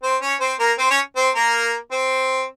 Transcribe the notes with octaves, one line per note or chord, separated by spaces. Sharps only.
C4 C5
C#4 C#5
C4 C5
A#3 A#4
C4 C5
C#4 C#5
C4 C5
A#3 A#4
C4 C5